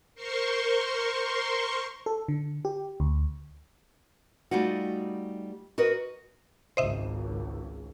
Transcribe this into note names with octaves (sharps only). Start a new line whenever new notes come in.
A#4 C5 C6 C#6
A4
D3
G4
D2
G3 A3 D#4 F4 F#4
F#4 A#4 B4 D#5
G#1 C#2 C5 D#5 E5